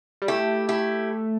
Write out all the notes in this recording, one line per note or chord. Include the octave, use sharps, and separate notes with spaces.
G3
A3 E4 G4
E4 G4